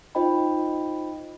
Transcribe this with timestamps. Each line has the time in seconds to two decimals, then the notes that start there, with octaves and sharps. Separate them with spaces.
0.15 D#4 F4 C5 D#5 G5 B5